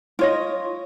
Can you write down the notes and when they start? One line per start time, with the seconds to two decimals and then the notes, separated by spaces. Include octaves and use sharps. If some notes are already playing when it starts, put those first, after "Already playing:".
0.19 F4 C#5 D#5